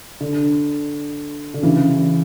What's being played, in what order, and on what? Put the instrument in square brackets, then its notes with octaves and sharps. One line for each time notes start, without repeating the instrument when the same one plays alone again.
[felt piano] D3
D3
C#3 E3